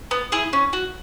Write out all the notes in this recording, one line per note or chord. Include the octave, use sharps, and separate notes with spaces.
B3
E4 G#4
C#4
F#4